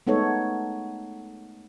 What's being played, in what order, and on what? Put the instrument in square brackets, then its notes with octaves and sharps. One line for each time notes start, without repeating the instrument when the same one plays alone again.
[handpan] G#3 A3 B3 D#4 A4 C#5